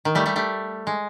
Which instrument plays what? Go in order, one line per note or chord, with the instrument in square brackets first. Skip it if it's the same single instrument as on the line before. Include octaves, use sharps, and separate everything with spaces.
[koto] D#3
G3 A3
G3 A3
G3 A3
G#3